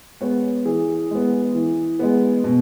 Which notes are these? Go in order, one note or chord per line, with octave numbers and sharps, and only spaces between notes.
G#3 B3 C#5
E3 G#4
G#3 B3
E3
G#3 B3
B2